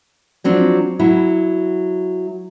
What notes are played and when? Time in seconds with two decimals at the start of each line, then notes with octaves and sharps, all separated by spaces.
0.44 F3 F#3 C4 D4
0.99 F#3 E4